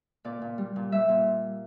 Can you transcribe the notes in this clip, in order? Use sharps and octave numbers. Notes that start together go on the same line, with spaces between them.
A#2 D5
A#2
G3
A#2
G3 E5
A#2